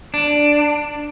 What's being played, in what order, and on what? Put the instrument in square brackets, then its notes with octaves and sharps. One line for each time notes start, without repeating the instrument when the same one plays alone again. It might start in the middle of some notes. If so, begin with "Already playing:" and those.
[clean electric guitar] D4